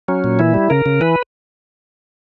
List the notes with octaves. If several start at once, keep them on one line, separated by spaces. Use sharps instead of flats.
F#3 C#4
A#2
E3 E4
G3
C#3 A#4
C#3
E3 B4